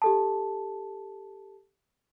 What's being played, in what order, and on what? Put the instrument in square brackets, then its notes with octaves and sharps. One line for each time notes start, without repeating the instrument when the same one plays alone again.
[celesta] G4 A4 A5